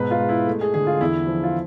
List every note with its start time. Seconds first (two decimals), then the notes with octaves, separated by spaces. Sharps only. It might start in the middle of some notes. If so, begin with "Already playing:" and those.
Already playing: G#2 B2 B4
0.11 F4
0.20 G#3
0.29 E4
0.47 A3
0.61 G#4
0.74 D3 G#4
0.87 F4
1.01 E2 E4
1.27 F3
1.43 F4